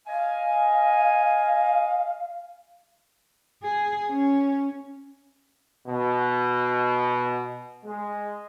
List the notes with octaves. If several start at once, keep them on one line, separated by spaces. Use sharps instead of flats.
D#5 F5 G#5
G#4
C#4
B2
G#3